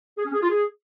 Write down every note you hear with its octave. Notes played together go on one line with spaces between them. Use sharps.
G#4
C#4
G#4
F4
G#4